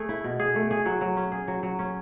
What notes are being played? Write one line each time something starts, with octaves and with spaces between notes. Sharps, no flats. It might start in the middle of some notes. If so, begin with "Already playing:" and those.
Already playing: A3 G#4
E4
B2
G#4
A3
G#4
F#3
F#3
C#4
G#4
F#3
F#3
C#4